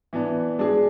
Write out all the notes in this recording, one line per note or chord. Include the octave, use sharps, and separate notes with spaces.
E3 B3 D4
G#3 D4 G#4